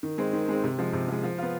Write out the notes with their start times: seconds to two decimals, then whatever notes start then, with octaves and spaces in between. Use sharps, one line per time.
0.03 D#3
0.18 G#3 C4
0.33 D#3
0.49 G#3 C4
0.64 C3
0.78 F3 G#3
0.93 C3
1.08 F3 G#3
1.23 F3
1.38 B3 F4